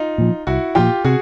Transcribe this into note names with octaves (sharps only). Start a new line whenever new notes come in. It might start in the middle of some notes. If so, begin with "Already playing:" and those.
Already playing: D#4 F4
A#2 F3
C2 E4 F#4
A#2 F3 F4 G4
C3 F#4 G#4